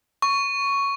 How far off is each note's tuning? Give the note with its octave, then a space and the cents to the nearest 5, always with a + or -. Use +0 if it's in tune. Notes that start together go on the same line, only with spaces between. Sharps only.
C#6 +5